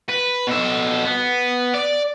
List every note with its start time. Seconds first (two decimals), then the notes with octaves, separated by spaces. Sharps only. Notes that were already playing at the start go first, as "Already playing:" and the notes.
0.09 B4
0.47 B2 A4
1.05 B3
1.74 D5